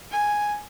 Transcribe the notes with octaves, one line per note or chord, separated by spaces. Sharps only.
G#5